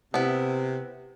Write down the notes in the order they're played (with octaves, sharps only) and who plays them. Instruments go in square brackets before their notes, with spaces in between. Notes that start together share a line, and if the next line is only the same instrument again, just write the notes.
[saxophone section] C3 [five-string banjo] B3 E4